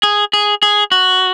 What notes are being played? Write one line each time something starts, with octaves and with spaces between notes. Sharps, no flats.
G#4
G#4
G#4
F#4